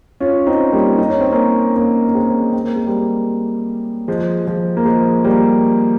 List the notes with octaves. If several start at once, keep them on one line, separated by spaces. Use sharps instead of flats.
C#4 F4
C4 D#4
G3 A#3
D#4
C#4
C4
A#3 C#4
A#3 C#4
A#3
G#3 C4
C4
A#3
G#3
G3 A#3
F3 G#3
F3 G#3
A#3
F3 G#3
G3 A#3